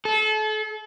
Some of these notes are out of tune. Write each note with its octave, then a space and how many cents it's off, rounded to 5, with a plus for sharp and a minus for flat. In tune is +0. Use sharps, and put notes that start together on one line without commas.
A4 -35